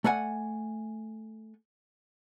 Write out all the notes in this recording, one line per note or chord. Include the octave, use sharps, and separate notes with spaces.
A3 D5 F#5 G#5